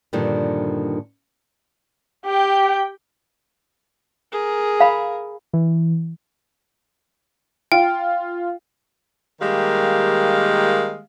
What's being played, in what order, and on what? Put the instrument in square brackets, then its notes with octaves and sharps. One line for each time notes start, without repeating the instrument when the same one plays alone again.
[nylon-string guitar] G2 A#2 D3 D#3 F3 G3
[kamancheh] G4 G5
[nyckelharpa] G#4 A#4
[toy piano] F5 B5
[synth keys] E3
[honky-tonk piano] F4 [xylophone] G5
[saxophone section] D#3 G3 G#3 A#3 G4 F5